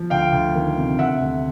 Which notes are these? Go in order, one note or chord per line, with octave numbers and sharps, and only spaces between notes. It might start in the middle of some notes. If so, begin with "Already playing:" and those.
Already playing: F3
D2 F5 G5
D2
D#3
C3
D2 E5 F#5
D2